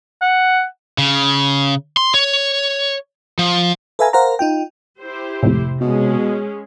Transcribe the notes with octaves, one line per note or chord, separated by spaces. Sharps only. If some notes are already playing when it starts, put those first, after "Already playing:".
F#5
C#3
C6
C#5
F3
A4 B4 E5 F5 G#5 A#5
A#4 C5 F5 F#5 A#5
D#4 F4 G5
E4 G4 C5
G#1 F2 A2 C3
B2 G#3 C#4 G#4